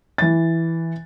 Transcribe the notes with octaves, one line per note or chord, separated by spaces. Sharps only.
E3 A6